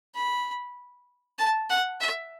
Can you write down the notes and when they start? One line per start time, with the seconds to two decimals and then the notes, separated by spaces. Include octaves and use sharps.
0.15 B5
1.38 A5
1.69 F#5
2.00 E5